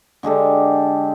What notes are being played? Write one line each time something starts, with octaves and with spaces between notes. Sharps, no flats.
D3 G#3 G4 A4